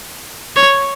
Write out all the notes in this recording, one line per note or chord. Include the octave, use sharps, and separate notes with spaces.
C#5